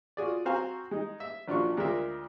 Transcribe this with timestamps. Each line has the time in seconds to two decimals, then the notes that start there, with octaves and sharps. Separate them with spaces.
0.17 F4 F#4 G#4 D5
0.45 C4 F#4 C5 F5 G#5 A#5
0.91 G#3 D#4
1.20 E5
1.48 A#1 D4 F4 F#4 C#6
1.77 D2 G#3 F4 A#4 E5